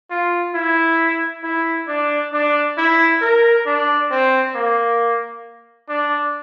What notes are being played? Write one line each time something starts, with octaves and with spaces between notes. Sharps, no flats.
F4
E4
E4
D4
D4
E4
A#4
D4
C4
A#3
D4